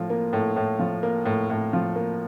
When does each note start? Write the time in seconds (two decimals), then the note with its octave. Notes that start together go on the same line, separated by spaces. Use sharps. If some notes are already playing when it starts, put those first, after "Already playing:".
Already playing: A2 F3
0.10 A#3
0.33 A2
0.56 A2
0.79 F3
1.03 A#3
1.26 A2
1.50 A2
1.73 F3
1.96 A#3